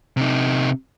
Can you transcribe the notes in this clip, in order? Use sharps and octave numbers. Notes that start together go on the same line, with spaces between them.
C3 D#4